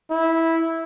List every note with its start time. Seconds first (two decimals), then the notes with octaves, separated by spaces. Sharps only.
0.10 E4